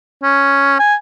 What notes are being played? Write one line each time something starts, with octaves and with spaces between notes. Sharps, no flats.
C#4
G#5